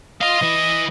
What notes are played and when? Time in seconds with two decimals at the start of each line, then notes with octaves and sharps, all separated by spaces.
0.22 D#5 F5 C6
0.42 E3 E4